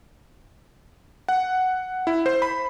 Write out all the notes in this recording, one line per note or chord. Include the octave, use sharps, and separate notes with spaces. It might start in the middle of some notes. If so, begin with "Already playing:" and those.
F#5
E4
C5
B5